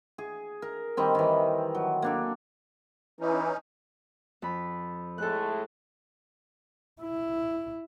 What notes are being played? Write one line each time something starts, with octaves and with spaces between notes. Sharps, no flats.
G#4
A#4
D#3 G3 C4
D#3 E3
F#3
A#3 D4 A4
E3 C#4 D#4
F2 B5
A2 G#3 A3 A4 F#6
E4